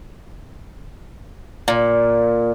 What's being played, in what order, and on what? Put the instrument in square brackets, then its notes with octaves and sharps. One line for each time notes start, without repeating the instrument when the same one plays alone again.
[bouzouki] A#2